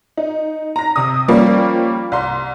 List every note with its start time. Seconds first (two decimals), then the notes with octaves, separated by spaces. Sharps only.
0.17 D#4
0.76 A#5 A#6
0.96 C3 D#6
1.28 F3 G3 A#3 C#4
2.12 C2 C6